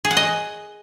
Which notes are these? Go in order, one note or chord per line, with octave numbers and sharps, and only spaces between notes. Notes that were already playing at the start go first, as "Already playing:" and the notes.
G#4
F#5
D#5